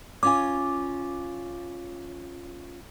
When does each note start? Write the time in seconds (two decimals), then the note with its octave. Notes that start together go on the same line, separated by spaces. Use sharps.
0.23 C#4 F4 G#5 D6